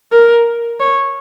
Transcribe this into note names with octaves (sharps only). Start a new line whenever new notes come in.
A#4
C#5